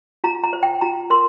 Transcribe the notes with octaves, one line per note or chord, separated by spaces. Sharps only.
F4 A#5
A#5
C5
G5
F4 A#5
A#4 C6